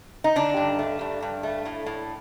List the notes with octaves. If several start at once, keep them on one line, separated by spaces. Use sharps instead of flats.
D#4
D3 D4
G2
A3
G2
G2
A3
A2
A2